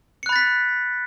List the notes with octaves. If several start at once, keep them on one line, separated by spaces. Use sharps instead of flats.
B5 F#6 A6 B6 C#7